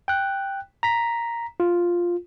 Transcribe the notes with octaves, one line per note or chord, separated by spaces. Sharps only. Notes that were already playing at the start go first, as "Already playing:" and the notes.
G5 F#6
A#5 B6
F4